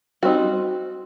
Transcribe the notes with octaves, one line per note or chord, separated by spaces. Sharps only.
G3 C4 D#4 F#4